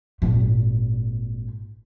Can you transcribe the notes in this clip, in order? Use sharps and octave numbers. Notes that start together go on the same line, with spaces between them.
G#1 A#2